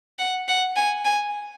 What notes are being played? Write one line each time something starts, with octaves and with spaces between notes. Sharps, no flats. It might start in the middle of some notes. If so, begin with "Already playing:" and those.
F#5
F#5
G#5
G#5